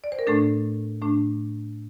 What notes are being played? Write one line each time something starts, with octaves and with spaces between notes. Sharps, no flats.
D5
C5
A#4
A2 A3 D4 A4
A2 A3 D4